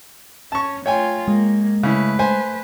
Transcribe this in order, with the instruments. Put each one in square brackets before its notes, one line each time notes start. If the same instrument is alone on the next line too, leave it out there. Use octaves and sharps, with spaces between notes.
[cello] C#4 [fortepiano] A5 C#6
[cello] A3 F4 [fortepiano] C#5 G5 G#5
[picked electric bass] G#3 [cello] A#3
[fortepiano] C#3 E4 [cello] A3 B4
[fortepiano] C5 G#5